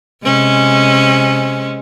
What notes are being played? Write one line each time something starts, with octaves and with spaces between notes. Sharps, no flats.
C3 G#3 C#4